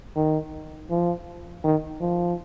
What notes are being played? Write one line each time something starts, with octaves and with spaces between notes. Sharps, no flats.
D#3
F3
D#3
F3